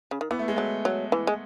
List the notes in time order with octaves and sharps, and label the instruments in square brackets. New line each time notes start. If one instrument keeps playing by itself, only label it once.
[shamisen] C#3
D#3
[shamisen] E3 [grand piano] B3
[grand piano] A3
G#3
[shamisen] F#3 [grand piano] A3
[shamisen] F#3
E3
G#3